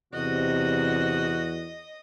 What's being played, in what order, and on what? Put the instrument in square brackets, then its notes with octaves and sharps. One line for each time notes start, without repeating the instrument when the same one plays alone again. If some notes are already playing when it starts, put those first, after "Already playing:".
[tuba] E2 [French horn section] C3 [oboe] F#4 [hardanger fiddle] D#5